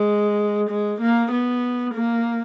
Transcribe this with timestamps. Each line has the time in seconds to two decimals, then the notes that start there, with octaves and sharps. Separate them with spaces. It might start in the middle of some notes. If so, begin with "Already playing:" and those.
Already playing: G#3
0.70 G#3
1.01 A#3
1.32 B3
1.95 A#3